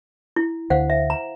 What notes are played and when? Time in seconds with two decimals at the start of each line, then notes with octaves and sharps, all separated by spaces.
0.36 E4
0.70 D2 C5 F5 F#5
0.90 E5
1.10 A#5